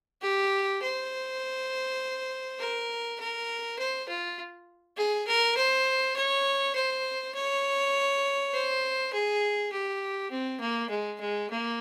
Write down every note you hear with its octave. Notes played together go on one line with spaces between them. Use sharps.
G4
C5
A#4
A#4
C5
F4
G#4
A#4
C5
C#5
C5
C#5
C5
G#4
G4
C4
A#3
G#3
G#3
A#3